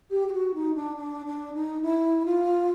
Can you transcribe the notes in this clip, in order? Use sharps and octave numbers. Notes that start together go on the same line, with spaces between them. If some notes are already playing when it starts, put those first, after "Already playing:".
G4
G4
F#4
D#4
D4
D4
D4
D#4
E4
F4